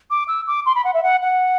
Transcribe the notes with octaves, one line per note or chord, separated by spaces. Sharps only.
D6
E6
D6
C6
B5
F#5
E5
F#5
F#5